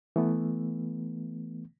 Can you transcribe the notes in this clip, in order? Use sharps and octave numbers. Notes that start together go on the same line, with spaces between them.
E3 A3 B3